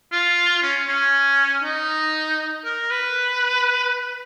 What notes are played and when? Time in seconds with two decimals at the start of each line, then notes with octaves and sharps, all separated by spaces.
0.12 F4
0.63 C#4
0.88 C#4
1.63 D#4
2.65 A#4
2.91 B4